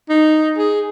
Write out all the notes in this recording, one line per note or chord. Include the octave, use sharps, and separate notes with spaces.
D#4
G#4